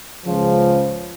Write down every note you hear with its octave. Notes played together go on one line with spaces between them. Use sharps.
C#2 C#3 F3